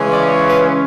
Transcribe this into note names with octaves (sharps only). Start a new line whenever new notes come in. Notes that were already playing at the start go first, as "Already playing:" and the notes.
Already playing: C#3 E3 G#3 C#4
D5
B4